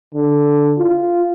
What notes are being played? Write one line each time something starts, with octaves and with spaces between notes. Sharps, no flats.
D3
F4